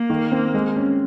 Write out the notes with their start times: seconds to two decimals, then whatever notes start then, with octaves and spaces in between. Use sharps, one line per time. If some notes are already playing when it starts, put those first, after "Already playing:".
Already playing: A#3
0.10 D#3
0.32 C4
0.54 G#3
0.76 C#4